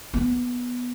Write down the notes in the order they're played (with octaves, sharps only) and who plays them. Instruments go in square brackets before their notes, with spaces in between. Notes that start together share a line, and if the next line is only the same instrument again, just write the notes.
[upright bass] B3